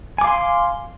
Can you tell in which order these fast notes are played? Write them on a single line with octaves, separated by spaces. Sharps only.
G#5 D6 F5 C6